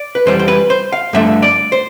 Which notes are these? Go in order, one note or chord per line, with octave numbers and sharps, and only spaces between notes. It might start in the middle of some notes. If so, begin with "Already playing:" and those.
Already playing: D5
B4
F2 E3 G3 C5
C5
B4
C5
F5
G2 D3 F3 A3 E5
D5
C5